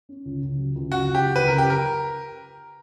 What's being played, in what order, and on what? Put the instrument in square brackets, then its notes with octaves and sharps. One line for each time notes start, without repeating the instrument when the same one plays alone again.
[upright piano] C#4
C#2
C#2
F#3
C#2
[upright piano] C#2 [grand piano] F#4
[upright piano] C#2
[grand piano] G4
[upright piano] F#3
[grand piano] B4
[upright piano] C#2
[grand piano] A#4
[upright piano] C#2 [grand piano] G4
[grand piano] A#4